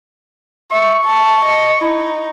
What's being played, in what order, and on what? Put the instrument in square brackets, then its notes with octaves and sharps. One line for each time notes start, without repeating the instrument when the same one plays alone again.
[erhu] E5 [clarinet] C#6
[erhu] A5
D#5
[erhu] D#4 [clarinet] E4